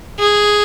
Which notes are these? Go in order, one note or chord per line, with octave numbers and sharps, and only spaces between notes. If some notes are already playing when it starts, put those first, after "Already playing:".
G#4